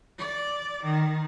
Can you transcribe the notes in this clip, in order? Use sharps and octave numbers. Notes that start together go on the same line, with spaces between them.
D5
D#3